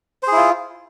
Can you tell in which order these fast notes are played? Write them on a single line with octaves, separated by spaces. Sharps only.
C5 G#4 E4 F4